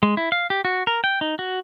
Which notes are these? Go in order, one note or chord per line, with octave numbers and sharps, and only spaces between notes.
G#3
E4
F5
G4
F#4
A#4
G5
D#4
F#4